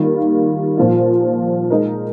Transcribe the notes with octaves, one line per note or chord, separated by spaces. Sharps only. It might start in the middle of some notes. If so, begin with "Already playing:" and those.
Already playing: D#3 G3 A#3 F4
A#2 F3 A#3 F4
G#3 D#4 A#4